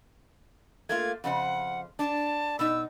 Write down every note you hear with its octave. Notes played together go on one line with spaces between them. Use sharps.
A3 A#3 F4 G#6
F2 C#3 C5 F#5
D4 A5
B2 D#4 E6